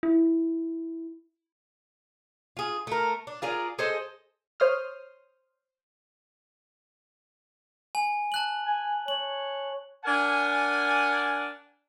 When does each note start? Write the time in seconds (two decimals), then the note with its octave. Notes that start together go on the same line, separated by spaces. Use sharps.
0.03 E4
2.57 F4 G#4
2.87 A3 A#4
3.27 D4
3.42 F4 G#4 A#4 D5
3.79 G#4 A4 C5 D#5
4.60 C5 C#5 C6 D#6 F6
7.95 G#5
8.32 A5 F#6 F#7
8.66 G#5
9.08 C#5 F#7
10.04 D4 A#4 F#5 G#5